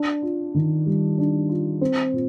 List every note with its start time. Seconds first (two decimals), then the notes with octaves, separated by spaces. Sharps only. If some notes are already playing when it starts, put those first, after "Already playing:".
Already playing: D4
0.22 F4
0.54 D#3
0.86 G3
1.18 D4
1.49 F4
1.81 C4
2.13 A#2